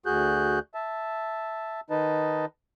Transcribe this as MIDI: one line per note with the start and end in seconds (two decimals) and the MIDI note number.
0.06 0.59 38
0.06 0.59 66
0.06 0.59 68
0.06 0.59 90
0.06 0.59 91
0.74 1.80 76
0.74 1.80 81
1.90 2.45 51
1.90 2.45 63
1.90 2.45 71
1.90 2.45 75
1.90 2.45 81